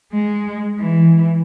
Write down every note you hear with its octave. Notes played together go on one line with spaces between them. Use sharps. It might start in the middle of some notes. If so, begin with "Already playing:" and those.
G#3
E3